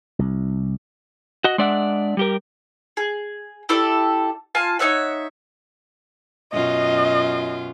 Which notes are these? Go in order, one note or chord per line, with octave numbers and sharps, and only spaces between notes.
C2
F#4 D#5
G#3 D4 D5 E5 F#5
G3 G4 A#4
G#4
E4 G4 A4 D5
F4 G#5 A5
D#4 C#5 E5 F#5
F#2 B2 F4 D#5